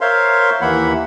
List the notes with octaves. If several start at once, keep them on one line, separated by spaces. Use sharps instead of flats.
A#4 C5 C#5 E5 F5 C6
D#2 E3 A#3 E5 F#5 B5